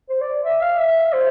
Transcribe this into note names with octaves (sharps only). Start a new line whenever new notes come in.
C5
D5
E5
F5
E5
C5